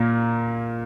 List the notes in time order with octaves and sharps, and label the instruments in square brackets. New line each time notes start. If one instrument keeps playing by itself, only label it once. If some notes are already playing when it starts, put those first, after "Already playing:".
Already playing: [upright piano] A#2 A#3